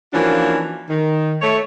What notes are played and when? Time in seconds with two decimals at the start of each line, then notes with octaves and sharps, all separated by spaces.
0.13 E3 F3 A#3 C#4 D4 F#4
0.89 D#3
1.42 A3 C#5